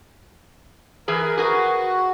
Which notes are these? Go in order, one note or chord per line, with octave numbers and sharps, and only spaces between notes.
E3 G#4 A#4 B4
F#4 G#4 A#4 B4